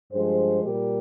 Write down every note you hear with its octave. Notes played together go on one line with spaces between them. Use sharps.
G2 F3 G#3 G#4 C5
A#2 G3 G4 A#4